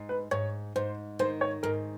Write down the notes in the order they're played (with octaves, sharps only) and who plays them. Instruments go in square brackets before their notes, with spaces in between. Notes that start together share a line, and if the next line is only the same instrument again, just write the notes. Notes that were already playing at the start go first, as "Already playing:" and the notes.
Already playing: [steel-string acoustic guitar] G#2
[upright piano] B4
[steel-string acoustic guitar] G#2 [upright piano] C#5
[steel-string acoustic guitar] G#2 [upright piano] C5
[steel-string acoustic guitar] D#3 [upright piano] C5
[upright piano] C#5
[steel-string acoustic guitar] G#2 [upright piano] A#4